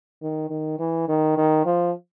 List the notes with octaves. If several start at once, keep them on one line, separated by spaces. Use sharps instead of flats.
D#3
D#3
E3
D#3
D#3
F3